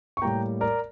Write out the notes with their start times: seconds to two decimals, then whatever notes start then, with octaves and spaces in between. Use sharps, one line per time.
0.17 C#6
0.22 A2 G3 A#3 G5 A#5
0.61 A#4 D5